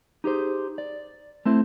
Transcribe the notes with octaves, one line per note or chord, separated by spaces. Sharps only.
D#4 G4 G#4 C5
D5
A3 C4 E4 C5